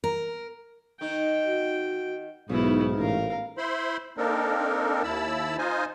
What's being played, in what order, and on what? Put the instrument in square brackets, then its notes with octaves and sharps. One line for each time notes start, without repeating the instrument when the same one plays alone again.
[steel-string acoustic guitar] A#4
[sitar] D#3 D#4 [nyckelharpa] G5
[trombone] F#4
[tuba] B1 [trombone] G#2 [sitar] C#3 [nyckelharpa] B3 E4
[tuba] A1 [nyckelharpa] A#4 F5
[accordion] E4 C5 B5 C6
A#3 C4 D4 D#4 A4 A#4
D#2 E4 A5 B5 E6
D#4 F4 C5 D#5 G#5